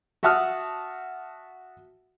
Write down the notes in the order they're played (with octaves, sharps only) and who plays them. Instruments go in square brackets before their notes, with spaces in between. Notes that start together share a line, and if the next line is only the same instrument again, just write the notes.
[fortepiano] F#4 E5 F#5 A5 D#6 F6